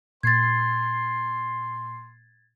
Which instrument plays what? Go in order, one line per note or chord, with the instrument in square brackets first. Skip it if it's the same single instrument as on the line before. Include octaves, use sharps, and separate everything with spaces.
[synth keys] A#2 C7 [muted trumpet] C6 [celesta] G#6 A6